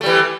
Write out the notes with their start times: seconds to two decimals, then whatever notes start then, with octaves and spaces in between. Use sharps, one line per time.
0.01 A3
0.03 G3
0.06 E3